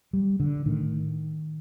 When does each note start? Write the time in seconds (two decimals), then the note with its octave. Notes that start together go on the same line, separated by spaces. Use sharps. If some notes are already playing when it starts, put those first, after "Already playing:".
0.13 G3
0.40 D3
0.65 A2 D#3